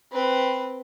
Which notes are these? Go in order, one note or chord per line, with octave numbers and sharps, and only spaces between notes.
C4 B4